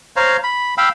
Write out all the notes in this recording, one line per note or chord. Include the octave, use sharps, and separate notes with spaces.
C5 C#5 F5 A#5
B5
F5 G5 B5 E6